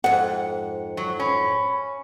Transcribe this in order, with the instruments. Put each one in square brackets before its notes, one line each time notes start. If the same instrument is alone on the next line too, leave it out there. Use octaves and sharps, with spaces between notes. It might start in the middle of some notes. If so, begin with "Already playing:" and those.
[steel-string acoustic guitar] F2 G#2 [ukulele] F#5
[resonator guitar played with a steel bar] F#3
[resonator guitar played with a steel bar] C#4 [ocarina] B5